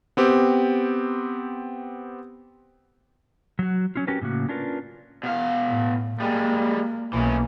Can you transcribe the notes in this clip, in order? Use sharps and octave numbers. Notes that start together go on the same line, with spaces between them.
B3 C4 G4
F#3 F#4
F#3 C#4 F4
C#4 F#4 G4 A#4 B4
A2 C#3 A#3 F#4
C#4 D4 F4 A#4 B4
B2 F5
A2
G3 G#3 A#3
B1 E3 A#3 C#4